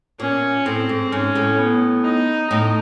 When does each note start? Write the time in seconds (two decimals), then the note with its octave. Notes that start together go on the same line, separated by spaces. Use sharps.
0.20 A#2 C#4
0.66 A2 C4
0.89 G#2
1.12 G#2 C#4
1.35 A2
1.58 B3
2.04 D#4
2.51 A2 D#4